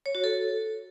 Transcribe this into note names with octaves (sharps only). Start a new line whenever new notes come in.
C#5
F#4
A4